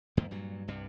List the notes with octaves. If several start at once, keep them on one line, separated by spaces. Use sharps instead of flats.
E2 G#2 D#3 A#3
G2 A#2 F#3
C2 G2 C3